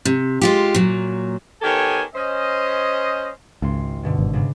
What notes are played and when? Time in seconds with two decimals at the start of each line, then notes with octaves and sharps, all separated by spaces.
0.05 C3
0.41 G#3 F4 G4
0.75 A#2 F#3
1.62 D#3 B3 G4 A4 C#5 G#5
2.15 C#4 C5 D#5
3.62 G#1 C#2 C6
4.03 G2 B2 D3
4.19 G#1
4.33 G#2 C#3 D4